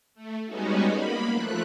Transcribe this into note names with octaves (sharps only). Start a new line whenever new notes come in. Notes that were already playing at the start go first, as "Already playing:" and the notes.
A3
G3 G#3 B3 C#4 D#4 F#4
A#3 B5
F3 A3 F#6